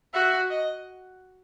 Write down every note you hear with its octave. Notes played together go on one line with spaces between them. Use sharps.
F#4 E5
D#5